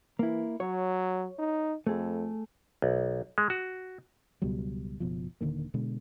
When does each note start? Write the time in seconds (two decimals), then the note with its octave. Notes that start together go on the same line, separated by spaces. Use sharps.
0.19 E3 A#3 E4
0.60 F#3 C#5
1.38 D#4
1.87 F2 A3 G#4
2.82 B1
3.38 G#3
3.50 F#4
4.42 C#2 B2 F#3 G3
5.00 F#1 B2 F3
5.41 D#1 D3 D#3 A#3
5.74 B2 D3 G#3